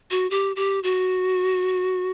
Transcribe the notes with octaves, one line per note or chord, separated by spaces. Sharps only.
F#4
G4
G4
F#4